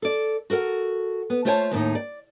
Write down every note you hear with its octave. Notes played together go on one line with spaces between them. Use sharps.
A4 D5
F#4 A4 A#4 F#5
B3
A3 F4 C5 C#5 G5 A5
D#2 A2 D#4
D5